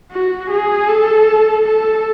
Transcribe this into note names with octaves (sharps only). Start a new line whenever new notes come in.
F#4
G#4
A4
A4